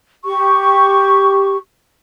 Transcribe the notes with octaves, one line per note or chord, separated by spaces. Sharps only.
G4 C#6